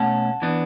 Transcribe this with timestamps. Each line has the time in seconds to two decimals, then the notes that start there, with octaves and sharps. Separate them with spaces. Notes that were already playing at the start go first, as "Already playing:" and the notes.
Already playing: B2 A3 C#4 F#5 A5
0.42 E3 B3 D4